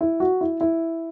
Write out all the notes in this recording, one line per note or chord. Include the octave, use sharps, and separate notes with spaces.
E4
F#4
E4
E4